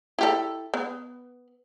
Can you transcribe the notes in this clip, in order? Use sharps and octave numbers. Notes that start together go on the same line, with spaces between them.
E4 G4 A4
B3